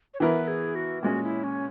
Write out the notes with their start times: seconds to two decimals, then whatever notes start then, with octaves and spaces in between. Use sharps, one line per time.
0.14 C#5
0.20 E3 B3 E4 A#4 B4
0.48 G#4
0.75 F#4
1.03 A#2 G#3 C#4 F#4
1.23 E4
1.44 C#4